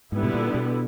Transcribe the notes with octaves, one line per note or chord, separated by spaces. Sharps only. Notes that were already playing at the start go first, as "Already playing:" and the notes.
G#2 D3 G3 B3 E4
B2
A#2
B2